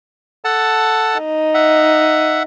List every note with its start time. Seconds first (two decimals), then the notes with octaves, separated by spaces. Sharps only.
0.44 A4 F#5 A5
1.17 D#4
1.54 E5 F#5